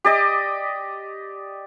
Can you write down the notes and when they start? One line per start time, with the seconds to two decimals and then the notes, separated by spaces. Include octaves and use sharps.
0.05 G4 D5 D#5